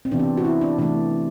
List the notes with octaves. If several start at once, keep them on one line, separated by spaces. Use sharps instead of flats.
C4
C3 E3 B3 D4
C4
F#4
E4
D4
C3 E3 A3 C4 D4